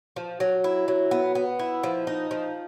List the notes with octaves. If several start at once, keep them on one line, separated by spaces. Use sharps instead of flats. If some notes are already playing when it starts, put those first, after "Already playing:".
F3
F#3
E4
F#3
B3
B3
E4
F3
D#4
F3